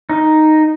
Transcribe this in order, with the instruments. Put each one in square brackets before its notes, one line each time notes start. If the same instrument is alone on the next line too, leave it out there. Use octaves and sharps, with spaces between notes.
[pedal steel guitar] D#4